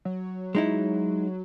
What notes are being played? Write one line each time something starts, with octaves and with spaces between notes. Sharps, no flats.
F#3
G#3 D#4 E4